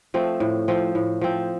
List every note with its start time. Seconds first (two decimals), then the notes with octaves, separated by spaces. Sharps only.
0.14 F3 A3 C4
0.40 A2
0.68 F3 C4
0.95 A2
1.21 F3 C4